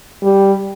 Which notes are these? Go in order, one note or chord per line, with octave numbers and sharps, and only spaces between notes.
G3